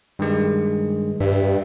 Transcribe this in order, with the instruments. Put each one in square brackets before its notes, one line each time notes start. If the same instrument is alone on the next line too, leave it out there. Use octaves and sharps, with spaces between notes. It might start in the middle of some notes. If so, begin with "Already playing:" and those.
[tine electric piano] G2 D#3 G#3
[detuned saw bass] G2 [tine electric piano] E5